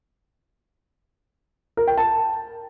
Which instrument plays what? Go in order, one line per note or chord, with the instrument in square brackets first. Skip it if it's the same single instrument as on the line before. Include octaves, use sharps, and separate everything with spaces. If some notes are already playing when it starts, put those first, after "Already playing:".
[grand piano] A#4
G5
A5